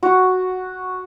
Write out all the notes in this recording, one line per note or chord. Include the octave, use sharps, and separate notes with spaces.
F#4